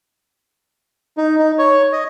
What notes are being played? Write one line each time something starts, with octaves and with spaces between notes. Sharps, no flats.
D#4
D#4
C#5
D#5